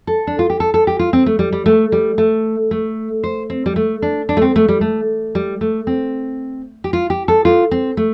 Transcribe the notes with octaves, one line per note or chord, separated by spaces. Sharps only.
A4
D4
F4
G4
A4
A4
G4
F4
C4
A3
G3
G3
A3
G3
A3
A3
C5
C4
G3
A3
D4
D4
A3
C4
A3
G3
A3
G3
A3
C4
G4
F4
G4
A4
F4
C4
A3